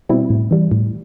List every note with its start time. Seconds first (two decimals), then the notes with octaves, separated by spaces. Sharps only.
0.09 B2 G3 C4 E4
0.30 A2
0.51 E3 G3
0.72 A2